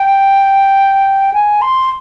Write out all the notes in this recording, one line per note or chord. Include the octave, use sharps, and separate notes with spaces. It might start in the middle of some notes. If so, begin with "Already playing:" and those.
Already playing: G5
G#5
C6